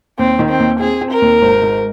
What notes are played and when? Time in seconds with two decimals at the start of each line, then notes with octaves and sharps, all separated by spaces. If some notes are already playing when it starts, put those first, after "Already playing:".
0.19 D#2 C4
0.39 D#3
0.50 C4
0.60 D#2
0.80 C4 G#4
1.01 C4
1.12 A#4
1.22 D#2
1.42 G#1
1.62 G#2